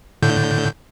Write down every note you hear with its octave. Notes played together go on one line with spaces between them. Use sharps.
A2 D3 G6